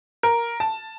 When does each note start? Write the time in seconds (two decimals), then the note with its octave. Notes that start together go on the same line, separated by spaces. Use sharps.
0.23 A#4
0.60 A5